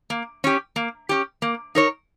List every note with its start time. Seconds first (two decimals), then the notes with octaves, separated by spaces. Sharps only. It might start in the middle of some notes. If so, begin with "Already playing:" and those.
0.10 A#3
0.44 C#4 G4
0.76 A#3
1.09 C#4 G4
1.42 A#3
1.75 D#4 A#4 C#5